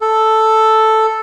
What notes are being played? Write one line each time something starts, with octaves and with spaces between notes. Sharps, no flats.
A4